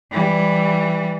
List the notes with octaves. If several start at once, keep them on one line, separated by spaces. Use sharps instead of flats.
E3 G3